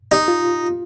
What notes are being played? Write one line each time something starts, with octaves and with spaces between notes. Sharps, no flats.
D#4 G4
F4